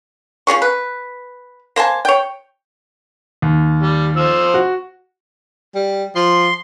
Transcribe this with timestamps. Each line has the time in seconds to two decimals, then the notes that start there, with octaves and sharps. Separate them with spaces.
0.47 F3 C#4 G#4 C#6
0.62 B4
1.76 A#3 C5 G#5 A5
2.05 C#5 G5
3.42 D#2
3.82 G3
4.17 F3 C5 E6
4.54 F#4
5.75 G3
6.15 F3 C6